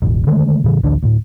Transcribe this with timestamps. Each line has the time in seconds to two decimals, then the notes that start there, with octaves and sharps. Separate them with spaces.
0.02 E1 A1 E2
0.27 D3 D#3 G#3 A3
0.64 A2 C#3 E3
0.83 A1 D2 D3 D4
1.03 D2 A2